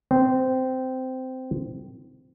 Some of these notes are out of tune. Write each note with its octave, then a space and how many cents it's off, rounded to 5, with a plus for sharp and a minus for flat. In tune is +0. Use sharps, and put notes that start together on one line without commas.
C4 -15